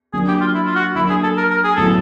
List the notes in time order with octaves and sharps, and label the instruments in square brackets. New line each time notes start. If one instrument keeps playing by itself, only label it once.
[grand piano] F#3 A#3 D4 [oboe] G#4
[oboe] G4
F4
E4
F4
F#4
[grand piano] F#3 A#3 D4 [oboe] E4
[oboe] G#4
A4
A#4
A#4
G#4
[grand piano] A2 F#3 B3 E4 [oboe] A4